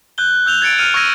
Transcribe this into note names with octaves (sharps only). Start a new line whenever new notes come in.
F#6 G6 G7
E6 G6 F7 G7
G#6 A6 C#7 D7
F6 C#7 D#7 F7
C#6 E6 G#6 A#6 D#7